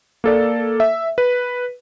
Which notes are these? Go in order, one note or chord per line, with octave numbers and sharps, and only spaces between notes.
A#3 A4 D5
E5
B4